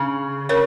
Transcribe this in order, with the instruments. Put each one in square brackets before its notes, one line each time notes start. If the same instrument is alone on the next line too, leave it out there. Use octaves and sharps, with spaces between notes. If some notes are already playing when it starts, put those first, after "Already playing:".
Already playing: [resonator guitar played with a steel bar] C#3
[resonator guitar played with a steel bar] C#3 [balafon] A#4 C#5